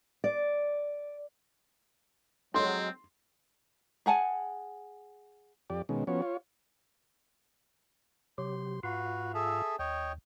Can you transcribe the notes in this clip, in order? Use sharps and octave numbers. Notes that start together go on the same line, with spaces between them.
D5
F#3 G#3 C4 C6
G#4 F#5 G#5 A5
F2 G4 D5
B2 D#3 G#3 C#4
F3 B3 C#4 F#4 C#5
F4 C#5
C3 F#3 G4 C6
G#2 F4 F#4 B4 F5
G#4 A4 E5
D#2 C#5 D#5 G5